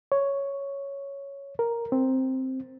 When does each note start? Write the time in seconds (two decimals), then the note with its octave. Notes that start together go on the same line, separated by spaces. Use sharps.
0.12 C#5
1.59 A#4
1.92 C4